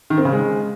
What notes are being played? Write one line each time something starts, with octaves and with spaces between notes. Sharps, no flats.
D#3
C4
C#3
G#3